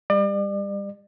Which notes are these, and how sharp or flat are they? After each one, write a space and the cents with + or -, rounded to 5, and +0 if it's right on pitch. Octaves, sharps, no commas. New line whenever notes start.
G3 +30 D5 +35